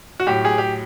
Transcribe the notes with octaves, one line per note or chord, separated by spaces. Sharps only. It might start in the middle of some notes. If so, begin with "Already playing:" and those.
F#4
A2 F#3 G4
G#4
G4